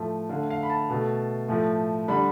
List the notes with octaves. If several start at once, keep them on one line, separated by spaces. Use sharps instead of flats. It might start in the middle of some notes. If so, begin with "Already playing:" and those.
Already playing: A2 F3 A3
D3 A3 F5
F5
B5
A5
B2 A3
A2 F3 A3
D3 G3 B5